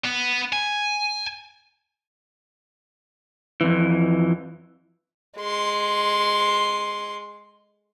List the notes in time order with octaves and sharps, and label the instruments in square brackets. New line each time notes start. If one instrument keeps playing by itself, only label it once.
[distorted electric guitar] B3
G#5
[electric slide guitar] F2 E3
[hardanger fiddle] G#3 C6